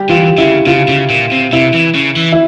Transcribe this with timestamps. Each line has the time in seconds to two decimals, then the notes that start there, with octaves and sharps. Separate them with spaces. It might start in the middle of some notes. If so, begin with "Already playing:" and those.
Already playing: G3 G4
0.09 E3 F4
0.38 C#3 E4
0.67 C#3 F4
0.88 C#3
1.10 A#2
1.31 C3
1.53 C3 E4
1.74 E3
1.95 C#3
2.16 E3
2.32 E4